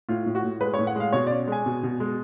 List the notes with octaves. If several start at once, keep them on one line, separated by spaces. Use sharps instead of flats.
A2 F4
A2
F#4
A2
G#3 B4
C#5
A2
F#5
G#3 F5
B2 C#5
C#4 D5
G#3 G#5
B2
B2
G#3